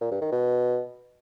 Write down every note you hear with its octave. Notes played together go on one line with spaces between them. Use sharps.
A#2
G2
D#3
B2